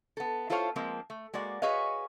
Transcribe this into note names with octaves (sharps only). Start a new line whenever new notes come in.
B3 A4
E4 F4 A4 C5 C#5 F5
F3 G#3 A#3 C4
A3
G#3 A#3 F#4 D5
F#4 G#4 B4 C#5 D#5 F5